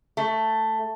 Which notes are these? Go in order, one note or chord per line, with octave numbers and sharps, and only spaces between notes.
A3